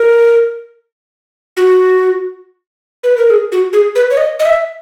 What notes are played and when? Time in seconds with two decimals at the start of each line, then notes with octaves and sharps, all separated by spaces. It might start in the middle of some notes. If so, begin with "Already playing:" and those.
Already playing: A#4
1.57 F#4
3.04 B4
3.17 A#4
3.30 G#4
3.52 F#4
3.73 G#4
3.95 B4
4.10 C#5
4.17 D#5
4.40 D#5
4.46 E5